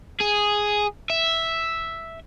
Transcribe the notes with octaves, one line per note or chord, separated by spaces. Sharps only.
G#4
E5